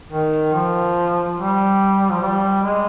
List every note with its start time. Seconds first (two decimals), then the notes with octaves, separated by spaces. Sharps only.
0.11 D#3
0.54 F3
1.37 G3
2.10 F3
2.21 G3
2.63 G#3